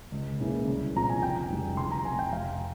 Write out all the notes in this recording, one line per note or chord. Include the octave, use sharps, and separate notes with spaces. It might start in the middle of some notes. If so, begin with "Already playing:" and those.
C#2
C#3 E3 A#3 E4
C2
A#2 F3 C4 F4 A#5
G#5
F1 G5
F2 C#3 E3 G3
F1 C6
A#5
F2 C3 G#5
G5
F2 F5